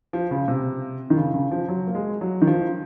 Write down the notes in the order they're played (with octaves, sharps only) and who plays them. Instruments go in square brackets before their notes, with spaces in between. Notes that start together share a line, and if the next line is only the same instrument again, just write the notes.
[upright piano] F3
C#3
C3
D#3
C#3
C#3
F3
F#3
A#3
G#3
F#3
D#3
F3